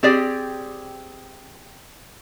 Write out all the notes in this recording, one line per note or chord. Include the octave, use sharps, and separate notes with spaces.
C4 G4 G#4 D5